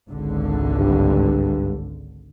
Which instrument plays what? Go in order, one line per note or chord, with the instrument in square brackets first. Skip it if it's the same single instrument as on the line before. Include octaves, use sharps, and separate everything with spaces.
[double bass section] G#1 C#2 D3
[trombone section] G2